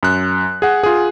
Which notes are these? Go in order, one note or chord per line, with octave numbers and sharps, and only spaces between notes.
F#2 F#6
G#4 F#5
F4 G#4